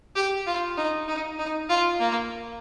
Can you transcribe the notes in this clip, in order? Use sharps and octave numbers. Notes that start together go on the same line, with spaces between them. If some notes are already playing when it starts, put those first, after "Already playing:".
G4
F4
D#4
D#4
D#4
F4
A#3